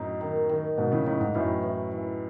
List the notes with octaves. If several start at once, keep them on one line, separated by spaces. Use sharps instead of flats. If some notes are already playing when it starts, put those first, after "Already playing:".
Already playing: F#2 A2 D#4
D#3
D#3
G#2 B2 D#4
A2 C#3
A2 C#3 D#4
G#2
F#2 A2 E3
E3
E3